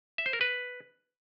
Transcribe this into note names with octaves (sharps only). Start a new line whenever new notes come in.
E5
C5
A#4
B4